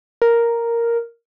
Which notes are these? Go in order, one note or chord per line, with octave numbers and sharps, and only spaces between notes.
A#4